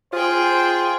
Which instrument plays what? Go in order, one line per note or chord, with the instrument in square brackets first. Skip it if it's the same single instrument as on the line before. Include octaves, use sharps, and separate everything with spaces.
[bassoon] F4 [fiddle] G#4 G5 [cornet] C5